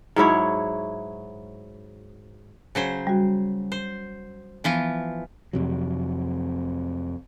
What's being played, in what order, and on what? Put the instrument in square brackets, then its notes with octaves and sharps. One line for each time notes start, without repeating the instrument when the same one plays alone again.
[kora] G#2 F#3 E4 C#5
[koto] C#3 F#3 C5
[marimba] G3 F#4
[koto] C5
[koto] E3 F3 F4 [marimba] B3
[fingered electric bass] F2 C3 F#3